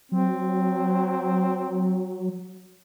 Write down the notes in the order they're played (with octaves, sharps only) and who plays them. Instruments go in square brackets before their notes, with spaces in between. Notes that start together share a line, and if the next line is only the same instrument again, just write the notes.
[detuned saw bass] F#3 [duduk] C4